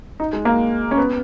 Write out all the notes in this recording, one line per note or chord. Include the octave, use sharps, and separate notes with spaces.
D#4
G#3
A#3
C#4
B3